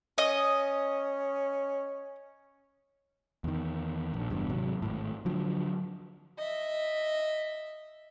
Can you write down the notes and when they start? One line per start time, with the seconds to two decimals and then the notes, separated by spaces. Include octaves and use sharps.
0.18 C#4 D#5
3.44 E2 D#3
4.14 A#1
4.30 F#1 E2 G2
4.49 G#1 C3 F#3
4.82 G#1 A2
5.25 D3 F3 F#3
6.38 D#5 E5